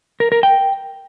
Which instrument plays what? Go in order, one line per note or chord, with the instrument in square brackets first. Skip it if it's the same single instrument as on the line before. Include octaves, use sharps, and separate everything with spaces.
[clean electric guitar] A#4
A#4
G5